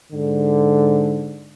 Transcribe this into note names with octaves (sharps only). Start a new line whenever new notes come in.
G#2 D3